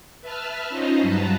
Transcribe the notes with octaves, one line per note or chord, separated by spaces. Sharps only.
B4 E5 A5 F6
C#4 D#4 F4 C5 D#5
G2 F#3 B4 A5 A#5